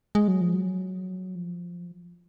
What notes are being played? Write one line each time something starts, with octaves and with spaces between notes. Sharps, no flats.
G#3
F#3
F3
F#3
F3